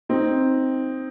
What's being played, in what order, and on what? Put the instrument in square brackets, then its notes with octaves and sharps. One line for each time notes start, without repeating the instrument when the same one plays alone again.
[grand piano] C4 D#4